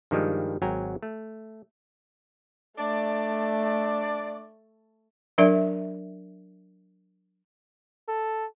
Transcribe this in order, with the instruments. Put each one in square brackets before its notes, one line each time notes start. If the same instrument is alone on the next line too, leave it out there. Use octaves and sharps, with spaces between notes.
[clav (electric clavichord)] G2 D#3 F3 G3 G#3
G#1 F#3 G5 G#5 A#5
A3
[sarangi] A3 [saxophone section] D4 D5
[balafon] F#3 D4 A#4 D5 E5
[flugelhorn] A4